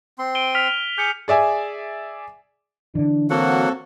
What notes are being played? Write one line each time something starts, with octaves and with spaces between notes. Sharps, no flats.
C4 C6
D7 D#7 G7
F6 B6 F7
G#4 G#5 D6 G6 C#7
G#4 D5 E5 G#5
D3 E3 D4
F#3 A#3 C4 F#4 A4 F#5